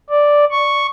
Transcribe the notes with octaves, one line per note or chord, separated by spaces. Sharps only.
D5
C#6